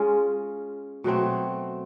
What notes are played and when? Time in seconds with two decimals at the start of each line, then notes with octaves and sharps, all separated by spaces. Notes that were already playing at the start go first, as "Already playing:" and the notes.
Already playing: G#3 C#4 F4 G#4
1.04 B2 F#3 A3 C4